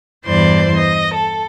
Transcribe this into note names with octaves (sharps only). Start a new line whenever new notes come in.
E2 G2 E3 C5 D5 C6
D#5
A4